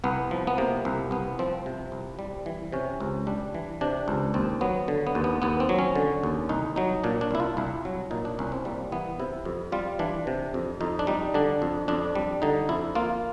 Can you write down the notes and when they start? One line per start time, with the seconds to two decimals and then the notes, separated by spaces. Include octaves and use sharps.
0.04 C2 B3
0.31 F3
0.47 B3
0.58 C3 A#3
0.85 C2
1.11 C2 B3
1.39 F3 C4
1.66 C3
1.92 C2
2.19 G3
2.46 E3
2.72 C3 C#4
3.00 C#2
3.27 G3 D4
3.54 E3
3.81 C3 D4
4.08 C#2
4.34 D#2 C4
4.61 F#3 B3
4.88 D3
5.07 B3
5.15 D#2
5.24 B3
5.42 D#2 B3
5.60 C4
5.69 F#3
5.79 C#4
5.95 D3
6.23 D#2
6.49 C2 D#4
6.76 F#3 D#4
7.04 A#2 D4
7.21 D4
7.31 C2 E4
7.40 F4
7.57 C2 E4
7.85 F#3
8.11 A#2 D#4
8.25 D4
8.39 C2 C#4
8.52 C4
8.65 G3 A#3
8.92 E3 B3
9.19 C3 E4
9.45 F2
9.72 G3 F4
9.99 E3 D4
10.27 C3
10.54 F2
10.81 F2 D#4
10.99 D4
11.07 G3 D#4
11.34 D3 D4
11.62 F2
11.88 F2 D4
12.15 G3
12.42 D3 D#4
12.69 F2 E4
12.95 A#3 F4